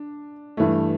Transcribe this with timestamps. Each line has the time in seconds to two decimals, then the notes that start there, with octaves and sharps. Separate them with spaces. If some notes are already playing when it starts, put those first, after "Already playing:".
Already playing: D4
0.57 G2 E3 A3